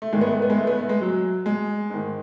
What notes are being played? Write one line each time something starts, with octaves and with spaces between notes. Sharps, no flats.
A3
G#2 D#3 G#3
B3
A3
B3
G#3
A3
B3
A3
G#3
F#3
G#3
G#2 D#3